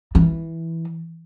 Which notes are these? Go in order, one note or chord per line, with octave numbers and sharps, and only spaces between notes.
E3